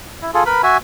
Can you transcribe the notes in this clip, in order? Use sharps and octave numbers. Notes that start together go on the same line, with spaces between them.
E4
F4 G#4 A4
A#4 B4 B5
F#4 E5 G#5